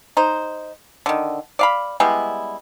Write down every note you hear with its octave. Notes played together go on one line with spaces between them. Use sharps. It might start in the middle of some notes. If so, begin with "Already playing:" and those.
D#4 C5
D3 D#3
D5 F5 B5
G3 G#3 B3 E4